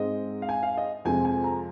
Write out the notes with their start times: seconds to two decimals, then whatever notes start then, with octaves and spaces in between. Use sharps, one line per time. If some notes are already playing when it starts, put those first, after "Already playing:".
Already playing: G#2 G#3 C4 D#5
0.42 F5
0.49 G#5
0.63 F5
0.77 D#5
1.05 F2 C3 G#3 C4 G#5
1.25 G#5
1.44 A#5